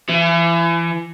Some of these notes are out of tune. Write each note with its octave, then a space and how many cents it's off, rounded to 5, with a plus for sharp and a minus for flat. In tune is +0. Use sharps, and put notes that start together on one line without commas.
E3 +35